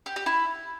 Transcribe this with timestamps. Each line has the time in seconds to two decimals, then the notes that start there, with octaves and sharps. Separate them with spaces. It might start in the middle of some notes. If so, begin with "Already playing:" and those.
0.06 G4
0.16 G4
0.26 E4